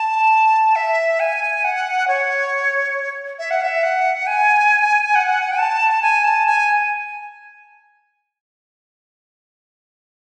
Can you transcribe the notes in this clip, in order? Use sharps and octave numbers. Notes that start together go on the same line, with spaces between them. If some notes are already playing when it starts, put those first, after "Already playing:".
Already playing: A5
E5
G#5
F#5
C#5
E5
F#5
E5
F#5
G#5
F#5
A5
G#5
A5
G#5